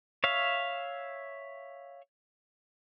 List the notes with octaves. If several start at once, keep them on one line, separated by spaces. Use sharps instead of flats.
C#5 E5 F5